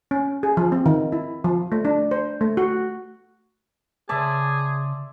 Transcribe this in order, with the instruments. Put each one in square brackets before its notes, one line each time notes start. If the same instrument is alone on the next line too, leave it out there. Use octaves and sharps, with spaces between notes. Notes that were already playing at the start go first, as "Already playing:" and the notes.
[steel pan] C#4
G#4
F3
C4
D#3
E4
F3
A3
D4
C5
A3
F#4
[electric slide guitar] C#3 A5 [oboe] G#4 [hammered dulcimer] D5 E5 C6